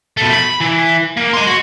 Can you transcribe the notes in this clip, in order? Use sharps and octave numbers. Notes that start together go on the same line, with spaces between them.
B2 A3
B5
E3
A#3
D#5 C6
F#4